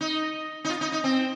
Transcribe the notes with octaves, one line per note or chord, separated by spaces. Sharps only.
D#4
D#4
F4
D#4
D#4
C4